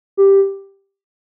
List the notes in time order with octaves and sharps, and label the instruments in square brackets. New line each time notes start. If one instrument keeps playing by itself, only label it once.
[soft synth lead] G4